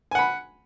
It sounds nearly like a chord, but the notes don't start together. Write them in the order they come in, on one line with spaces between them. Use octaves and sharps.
G#5 F#5 B5